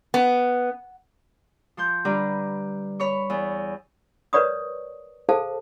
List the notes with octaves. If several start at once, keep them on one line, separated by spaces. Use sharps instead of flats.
B3
F3 C6 G6
D3 G3 D4 B4 A#5
C#5 B5 C#6
E2
A#4 B4 C#5 D5 C#6 D#6
G#4 A4 C5 F5 A5